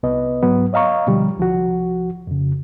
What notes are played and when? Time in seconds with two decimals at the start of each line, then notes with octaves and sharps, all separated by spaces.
0.03 C2 B3 B4 D#5
0.43 G#2 F#3 B3
0.73 C#5 D#5 F5 A#5 C#6
1.07 B2 D3 F3 G3
1.38 C2 F3 F#4
2.27 F2 C#3